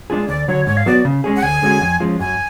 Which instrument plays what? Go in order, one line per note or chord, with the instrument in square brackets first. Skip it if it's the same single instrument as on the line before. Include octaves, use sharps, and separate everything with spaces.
[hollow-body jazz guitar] G#3 D4 F4 G#4
[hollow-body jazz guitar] D2 [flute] D5
[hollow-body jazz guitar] D3 F#3 [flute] C#5
[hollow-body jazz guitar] G#2 [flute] C#5
[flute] F5
[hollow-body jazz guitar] F#3 B3 F#4 [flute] D5
[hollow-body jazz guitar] C#3
G#3 C#4 G#4
[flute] F#5
[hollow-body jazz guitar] D2 [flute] G#5
[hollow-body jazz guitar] D3 G#3 C#4 F#4
F2
F3 G#3 C#4 F4
[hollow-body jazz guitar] F#2 [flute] G#5